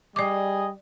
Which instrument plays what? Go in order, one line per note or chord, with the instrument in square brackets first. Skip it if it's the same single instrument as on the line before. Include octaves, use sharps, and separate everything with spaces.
[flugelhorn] G3 [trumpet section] G#4 D#5 [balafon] D5 D6